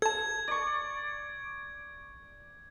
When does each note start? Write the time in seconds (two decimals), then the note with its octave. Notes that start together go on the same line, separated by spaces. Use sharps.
0.02 A4 A5 G#6
0.48 D5 C#6